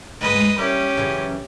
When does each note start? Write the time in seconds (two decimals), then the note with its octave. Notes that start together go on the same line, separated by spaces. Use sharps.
0.21 D2 G#2 G#3 B4 D#5
0.58 G3 A#3 C#4 E4 G4
0.97 F#2 C#3 E3